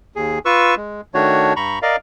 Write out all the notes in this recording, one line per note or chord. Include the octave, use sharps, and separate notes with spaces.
D#2 G#4
F4 B4 C#6 E6
G#3
D#3 A3 D4 F#4 C#5
G2 A#5 B5 C#6
A#4 D5 D#5 F5